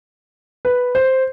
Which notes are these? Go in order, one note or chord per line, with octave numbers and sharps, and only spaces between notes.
B4
C5